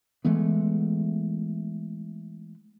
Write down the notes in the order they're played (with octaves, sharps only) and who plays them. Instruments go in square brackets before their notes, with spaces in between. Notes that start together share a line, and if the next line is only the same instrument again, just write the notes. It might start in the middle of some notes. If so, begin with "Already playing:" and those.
[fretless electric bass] E3 G#3 A3 B3